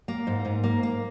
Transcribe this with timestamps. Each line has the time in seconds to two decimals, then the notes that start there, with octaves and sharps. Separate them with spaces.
0.08 A#3
0.27 G#2
0.45 G#2
0.63 A#3
0.83 A#3